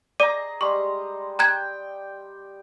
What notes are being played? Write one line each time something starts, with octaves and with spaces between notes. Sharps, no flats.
G#4 D5 D#5 A#5 D6 D#7
G3 G#3 C#6
G5 A#5 F#6 G#6